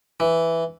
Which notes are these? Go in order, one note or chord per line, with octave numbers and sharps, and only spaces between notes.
E3